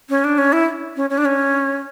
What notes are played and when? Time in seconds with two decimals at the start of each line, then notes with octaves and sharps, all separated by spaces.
0.10 C#4
0.24 D4
0.38 C#4
0.53 E4
0.96 C#4
1.10 C#4
1.18 D4
1.25 C#4